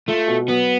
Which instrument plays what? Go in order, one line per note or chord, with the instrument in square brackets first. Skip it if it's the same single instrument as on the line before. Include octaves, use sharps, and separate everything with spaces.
[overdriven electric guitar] A3 [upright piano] F4
[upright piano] B2
[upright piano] F#3 [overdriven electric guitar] B3